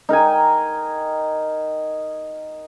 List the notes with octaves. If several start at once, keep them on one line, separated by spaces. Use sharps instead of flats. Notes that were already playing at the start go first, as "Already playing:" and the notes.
D#4 A#4 G5 G#5